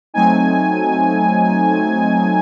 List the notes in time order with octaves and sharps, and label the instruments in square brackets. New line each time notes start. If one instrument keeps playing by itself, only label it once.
[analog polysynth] F#3 A3 C4 D#4 G#5